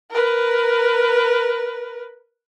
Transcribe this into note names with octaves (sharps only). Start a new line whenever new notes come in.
A#4 B4